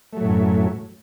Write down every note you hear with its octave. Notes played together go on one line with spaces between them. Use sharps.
F#2 A2 F#3 A3